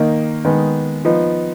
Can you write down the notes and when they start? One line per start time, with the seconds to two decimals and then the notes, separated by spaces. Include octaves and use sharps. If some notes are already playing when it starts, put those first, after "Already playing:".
Already playing: D#3 A#3 D#4
0.45 D#3 G#3 B3
1.05 F3 B3 D#4